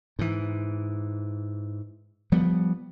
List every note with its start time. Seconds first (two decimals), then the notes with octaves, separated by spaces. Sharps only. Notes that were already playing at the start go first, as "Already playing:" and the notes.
0.19 G#2 E3
2.32 F3 G3 B3